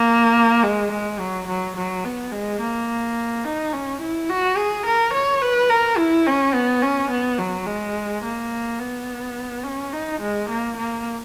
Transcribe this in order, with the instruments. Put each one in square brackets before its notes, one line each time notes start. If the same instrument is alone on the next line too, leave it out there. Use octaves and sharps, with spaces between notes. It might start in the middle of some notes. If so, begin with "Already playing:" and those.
Already playing: [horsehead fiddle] A#3
G#3
G#3
F#3
F#3
F#3
B3
G#3
A#3
D#4
C#4
E4
F#4
G#4
A#4
C#5
B4
A#4
E4
C#4
B3
C#4
B3
F#3
G#3
A#3
B3
C#4
D#4
G#3
A#3
A#3